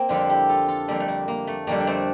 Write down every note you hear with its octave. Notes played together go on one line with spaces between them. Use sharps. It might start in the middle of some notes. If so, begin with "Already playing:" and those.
Already playing: A#3 C4
F2 D3 G3 D4 F4
E4 G4
F4 A4
F4 A4
F2 D3 G3 A#3
A3
A#3
A#3
A3
F2 D3 G3 A#3
D4
A3 C4